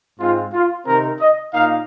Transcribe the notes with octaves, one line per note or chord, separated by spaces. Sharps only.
G#2 G#3 C4 F4
F4
C3 D#3 C4 D#4 A#4
D#5
A#2 A#3 D#4 F5